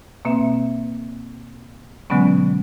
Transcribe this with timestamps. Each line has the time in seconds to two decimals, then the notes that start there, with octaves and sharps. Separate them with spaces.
0.25 B2 A#3 C4 E5
2.10 B2 D3 F#3 G#3 B3 C#4